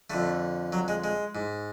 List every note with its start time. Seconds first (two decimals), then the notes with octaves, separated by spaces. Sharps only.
0.10 F2 D3 A3
0.72 F#3
0.88 G#3
1.04 G#3
1.35 G#2